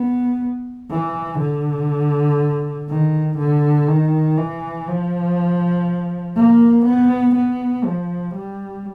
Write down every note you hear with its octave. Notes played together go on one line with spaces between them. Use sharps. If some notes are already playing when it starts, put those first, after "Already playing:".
Already playing: B3
E3
D3
D#3
D3
D#3
E3
F3
A#3
B3
B3
F3
G3